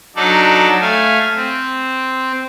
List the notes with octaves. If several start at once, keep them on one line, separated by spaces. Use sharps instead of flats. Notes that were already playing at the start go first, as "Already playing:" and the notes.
F#3 D4 D#4 A4 D5
A3 F5 G#5
C4